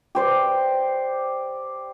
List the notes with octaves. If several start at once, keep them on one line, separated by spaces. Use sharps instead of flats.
G4 C5 D5